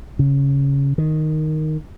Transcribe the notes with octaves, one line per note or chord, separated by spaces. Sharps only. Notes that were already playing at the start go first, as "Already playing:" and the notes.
C#3
D#3